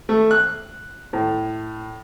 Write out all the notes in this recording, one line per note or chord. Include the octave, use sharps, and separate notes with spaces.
A3
F#6
A2